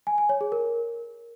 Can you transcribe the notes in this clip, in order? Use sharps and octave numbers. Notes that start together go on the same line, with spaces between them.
G#5
G#5
C#5
G#4
A#4